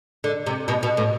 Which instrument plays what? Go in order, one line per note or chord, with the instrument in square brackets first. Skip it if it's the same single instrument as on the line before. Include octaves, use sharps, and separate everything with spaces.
[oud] D3
C3
B2
B2
A2